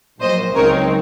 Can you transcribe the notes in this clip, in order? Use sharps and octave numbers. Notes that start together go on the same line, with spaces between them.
A#1 A#2 F#3 C5 D#5
C#2 C#3 F#3 C4 D#4 A#4 C#5